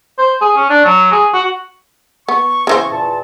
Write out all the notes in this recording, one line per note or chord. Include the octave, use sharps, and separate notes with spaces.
C5
G#4
C#4
D4
F#3
G#4
F#4
B3 C#6
C#3 E3 C5
E2 A#2 A5